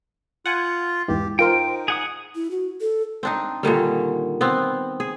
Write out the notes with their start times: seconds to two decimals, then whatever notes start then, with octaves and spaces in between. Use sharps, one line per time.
0.46 F4 F#5 G#5
1.08 E2 G#2 E3 G4
1.39 D#4 F4 A#4 C5 G5
1.88 G#4 F#5 D#6
2.35 E4
2.51 F#4
2.81 A4
3.23 C4 D4 D#4
3.63 A#2 D3 D#3 G3
4.41 B3 C4
5.00 G#4